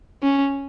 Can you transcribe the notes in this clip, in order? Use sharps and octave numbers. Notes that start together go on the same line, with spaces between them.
C#4